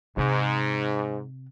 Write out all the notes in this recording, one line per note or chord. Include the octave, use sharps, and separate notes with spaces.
G#2 C3